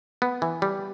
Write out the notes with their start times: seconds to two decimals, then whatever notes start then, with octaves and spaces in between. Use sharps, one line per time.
0.22 B3
0.42 E3
0.62 G3